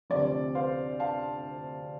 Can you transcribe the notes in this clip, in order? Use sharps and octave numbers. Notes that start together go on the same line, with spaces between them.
D2 C3 F3 D5
C5 F5
F5 A5